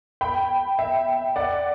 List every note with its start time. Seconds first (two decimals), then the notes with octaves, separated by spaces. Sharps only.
0.21 G5 B5
0.79 E5 G5
1.36 D5 F#5